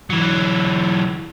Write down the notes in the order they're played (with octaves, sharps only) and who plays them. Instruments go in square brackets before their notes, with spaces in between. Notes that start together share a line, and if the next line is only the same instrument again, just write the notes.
[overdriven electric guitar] E3 F#3